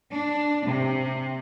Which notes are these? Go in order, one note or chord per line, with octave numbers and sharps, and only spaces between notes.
D4
C3